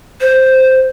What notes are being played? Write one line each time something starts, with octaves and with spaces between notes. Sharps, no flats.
C5